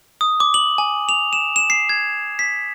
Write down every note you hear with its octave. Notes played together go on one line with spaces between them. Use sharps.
D#6
D6
F#7
G#5
F7
E7
E7
C7
G#6
B6